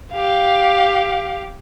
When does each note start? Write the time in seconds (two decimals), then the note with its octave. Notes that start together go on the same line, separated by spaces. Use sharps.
0.14 G4 F5